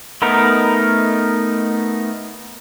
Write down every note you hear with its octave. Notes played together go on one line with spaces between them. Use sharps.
A3 B3 D#4 A#4